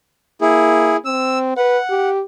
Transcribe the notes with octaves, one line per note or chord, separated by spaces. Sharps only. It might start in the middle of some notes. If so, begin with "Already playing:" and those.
A#3 E4 G#4
C4 E6
B4 F#5
G4